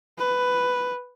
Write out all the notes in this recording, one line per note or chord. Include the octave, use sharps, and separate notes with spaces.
B4